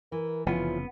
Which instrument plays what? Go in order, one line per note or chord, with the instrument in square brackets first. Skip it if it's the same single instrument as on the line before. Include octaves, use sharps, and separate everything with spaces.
[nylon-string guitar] E3 [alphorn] A#4
[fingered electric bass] F1 C#3 [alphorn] E3 [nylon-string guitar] F3 C#4 F4 [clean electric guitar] B3